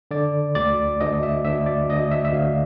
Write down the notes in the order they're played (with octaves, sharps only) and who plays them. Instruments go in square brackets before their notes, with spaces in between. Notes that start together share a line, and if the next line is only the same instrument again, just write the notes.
[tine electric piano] D3 D5
D2 D5
D2 D#5
E5
D2 E5
D5
D2 D#5
E5
E5
D2 F5